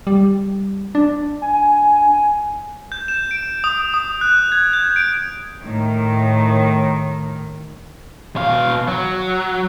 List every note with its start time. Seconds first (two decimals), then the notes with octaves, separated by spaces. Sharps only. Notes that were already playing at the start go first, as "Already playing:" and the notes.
0.07 G3
0.95 D4
1.42 G#5
2.92 G6
3.08 E7
3.31 D7
3.64 D#6
3.94 D#6
4.21 F#6
4.52 G#6
4.73 G6
4.96 D7
5.63 A2 D#3
8.36 B2 F5
8.88 F#3